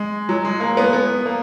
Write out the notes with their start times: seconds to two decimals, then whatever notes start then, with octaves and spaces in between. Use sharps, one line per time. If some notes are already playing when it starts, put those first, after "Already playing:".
Already playing: G#3
0.29 F#3
0.45 G#3
0.60 A#3
0.77 B3
0.93 B3
1.26 A#3